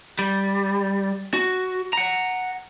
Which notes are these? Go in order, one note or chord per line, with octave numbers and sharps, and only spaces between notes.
G3
F#4
F#5 A#5